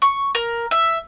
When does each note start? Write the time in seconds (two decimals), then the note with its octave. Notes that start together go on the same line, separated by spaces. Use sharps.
0.02 C#6
0.35 A#4
0.71 E5